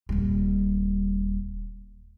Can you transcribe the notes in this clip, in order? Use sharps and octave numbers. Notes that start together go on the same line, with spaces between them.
D#1 G3